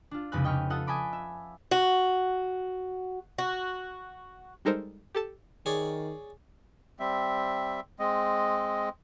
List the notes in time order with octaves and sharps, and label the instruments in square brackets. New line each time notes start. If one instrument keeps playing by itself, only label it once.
[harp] D4 F4
F1 C2 C#3 G#3 B4 F#6
D#5 G5 C#6 F6
F4 A4 E5 F#5 D#6
D#5 G#5 A5 B5 D6
E5
[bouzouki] F#4
F#4
[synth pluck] G3 G#3 D#4 A4 A#4 C5
G4 A4 A5
[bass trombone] D#3 [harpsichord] G#4 C#5 D5
[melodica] G3 C4 E5
G#3 C4 D#5